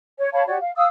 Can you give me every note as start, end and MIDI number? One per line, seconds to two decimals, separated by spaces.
0.19 0.30 73
0.33 0.46 73
0.33 0.46 77
0.33 0.46 81
0.33 0.46 83
0.47 0.57 66
0.47 0.57 67
0.47 0.57 73
0.47 0.57 74
0.60 0.72 77
0.76 0.87 77
0.76 0.87 87
0.76 0.87 88